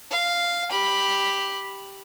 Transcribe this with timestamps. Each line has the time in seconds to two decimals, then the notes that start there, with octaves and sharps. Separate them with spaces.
0.11 F5
0.71 G4 B5